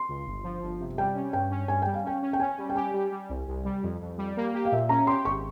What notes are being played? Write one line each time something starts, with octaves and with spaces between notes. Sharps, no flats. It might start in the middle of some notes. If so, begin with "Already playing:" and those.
Already playing: C6
C#2
G1
F3
G1
C3
G3 G5
C#4
G2 G5
C#4
G2 G#5
G3 G5
F5
C#4 G5
C#4
G5
C#4 G#5
G3
G5
G4 G#5
G3
G3
C2
C2
G3
F2
F2
G3
A#3
G4
F5
A#2 E5
C#4 A#5
G4 C6
G#1 C#6